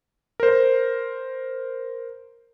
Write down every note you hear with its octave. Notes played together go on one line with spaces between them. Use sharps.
A#4 C5